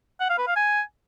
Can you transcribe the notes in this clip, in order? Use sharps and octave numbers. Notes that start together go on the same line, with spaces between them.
F#5
F5
B4
F5
G#5